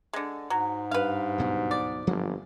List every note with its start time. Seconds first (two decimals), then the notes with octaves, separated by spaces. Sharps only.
0.13 D3 G#3
0.50 G#2 F#3
0.91 G2 B4 F5
1.38 D2 B2 F#3
1.71 D5
2.07 G1 F3 F#3 A#3